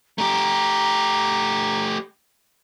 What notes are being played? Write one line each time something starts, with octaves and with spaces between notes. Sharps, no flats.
A3 G4 A#5